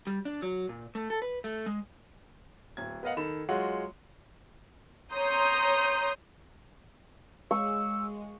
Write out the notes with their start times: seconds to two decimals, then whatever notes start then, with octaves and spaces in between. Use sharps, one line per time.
0.07 G3
0.25 D4
0.42 F#3
0.69 A#2
0.95 A3
1.10 A4
1.22 B4
1.44 A3
1.66 G#3
2.77 D1 G#6
3.03 B3 A#4 D#5 F5 F#5
3.17 D#3 A4 B5 E7
3.49 F#3 G#3 F4 F#4 C#5 F#5
5.13 C#5 A#5 C6 D#6 G6
7.51 G#3 C#6 E6